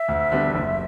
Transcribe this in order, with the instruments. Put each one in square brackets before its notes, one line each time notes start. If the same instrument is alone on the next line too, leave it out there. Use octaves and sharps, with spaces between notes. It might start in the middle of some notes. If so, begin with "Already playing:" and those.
Already playing: [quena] E5
[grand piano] D2
D3 G3 B3
F#1